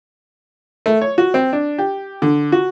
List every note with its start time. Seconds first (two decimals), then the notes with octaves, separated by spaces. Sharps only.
0.86 A3
1.01 C#5
1.18 F#4
1.34 C4
1.53 D4
1.78 G4
2.22 D3
2.52 F#4